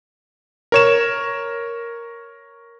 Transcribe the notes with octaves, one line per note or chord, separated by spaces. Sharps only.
A#4 C#5 E7